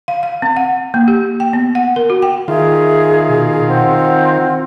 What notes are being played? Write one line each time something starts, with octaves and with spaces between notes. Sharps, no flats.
F5
F5
C4
F#5
A#3
G4
G5
B3
F#5
A#4
F#4
G5
D#3 F4 G#4 E5
B2
C4 F#5